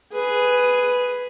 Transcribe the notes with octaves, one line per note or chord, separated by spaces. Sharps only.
G#4 B4